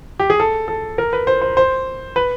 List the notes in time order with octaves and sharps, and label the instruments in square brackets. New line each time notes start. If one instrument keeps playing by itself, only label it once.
[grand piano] G4
G#4
A4
A4
A#4
B4
C5
C5
C5
B4